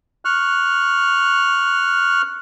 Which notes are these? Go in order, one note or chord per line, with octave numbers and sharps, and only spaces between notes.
C#6 F6 F#6